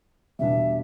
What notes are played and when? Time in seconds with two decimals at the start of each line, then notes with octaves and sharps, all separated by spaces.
0.39 E2 B2 G3 D4 E5